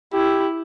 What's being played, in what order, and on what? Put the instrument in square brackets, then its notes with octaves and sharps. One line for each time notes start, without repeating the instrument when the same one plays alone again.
[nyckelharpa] E4 [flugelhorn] G4